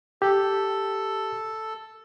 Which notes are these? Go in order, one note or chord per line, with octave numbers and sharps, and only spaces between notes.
G4 A4